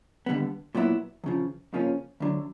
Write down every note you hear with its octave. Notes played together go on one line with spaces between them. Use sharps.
D#2 D3 G3 B3
A#2 F#3 B3 E4
E2 C#3 F3
F2 C#3 F3 A#3 C#4
D2 D3 F#3